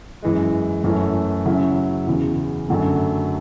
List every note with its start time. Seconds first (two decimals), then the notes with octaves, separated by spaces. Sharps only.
0.22 F#2 E3 G#3
0.84 F#2 E3 A3 C#4 E4
1.45 C#3 F#3 C#4 E4
2.07 E2 C#3 E3
2.69 F#2 D3 F#3 A3